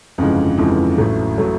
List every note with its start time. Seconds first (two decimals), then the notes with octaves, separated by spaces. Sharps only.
0.18 G1 F2 C#3 E3 G#3
0.57 G1 F2 C#3 E3 G#3
0.98 A1 A2 F#3 A3
1.38 A2 F#3 A3